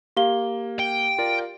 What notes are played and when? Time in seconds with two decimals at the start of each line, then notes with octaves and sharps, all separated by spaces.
0.17 A#3 G4 F5 G7
0.79 G5
1.18 F4 A#4 D5